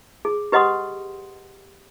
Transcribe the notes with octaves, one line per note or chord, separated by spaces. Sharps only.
G#4
G4 B4 D#5 F#5 C6 D#6